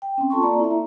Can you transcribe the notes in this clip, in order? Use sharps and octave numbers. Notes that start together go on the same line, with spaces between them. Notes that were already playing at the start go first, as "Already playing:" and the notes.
G5
C4 C#4
F4 A4 A5 C6 C#6
A#3 D5 A#5
E4 E5
A#5